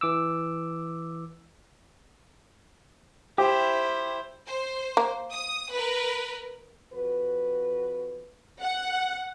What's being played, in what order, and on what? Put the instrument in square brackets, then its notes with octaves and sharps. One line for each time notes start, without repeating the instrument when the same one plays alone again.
[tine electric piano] E3 D6 E6
[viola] E4 C5 [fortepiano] G4
[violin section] C5
[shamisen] A#3
[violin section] D#6
A#4 B4
[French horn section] F2 F#4 B4
[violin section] F#5